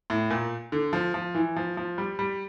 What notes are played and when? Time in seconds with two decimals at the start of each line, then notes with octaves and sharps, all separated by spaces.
0.10 A2
0.30 A#2
0.72 D3
0.93 F3
1.14 F3
1.35 E3
1.56 F3
1.77 F3
1.98 G3
2.19 G3